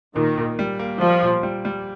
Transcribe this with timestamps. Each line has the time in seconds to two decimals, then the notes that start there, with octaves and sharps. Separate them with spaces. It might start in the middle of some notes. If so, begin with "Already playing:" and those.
0.16 A#2 D#3
0.37 A#2
0.59 G3
0.79 A#3
1.01 F3 G3
1.22 A#2
1.43 G3
1.65 G3